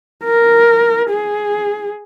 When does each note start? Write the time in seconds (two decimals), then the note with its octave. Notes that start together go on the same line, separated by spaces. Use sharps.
0.24 A#4
1.10 G#4